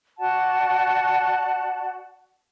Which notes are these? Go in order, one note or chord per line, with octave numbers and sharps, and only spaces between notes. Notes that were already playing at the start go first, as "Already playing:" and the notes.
F#4 D5 F#5 A5